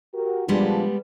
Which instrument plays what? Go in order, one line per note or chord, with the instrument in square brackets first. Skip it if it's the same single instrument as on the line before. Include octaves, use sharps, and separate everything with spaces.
[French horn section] F#4 G4 A#4
[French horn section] A#2 F3 D4 [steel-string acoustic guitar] G3 G#3 B3